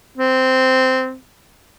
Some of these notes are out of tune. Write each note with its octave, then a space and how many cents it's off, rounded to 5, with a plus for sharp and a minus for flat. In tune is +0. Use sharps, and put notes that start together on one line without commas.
C4 -10